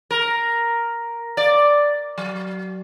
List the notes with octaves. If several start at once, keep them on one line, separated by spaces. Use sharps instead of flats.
A#4
D5
F#3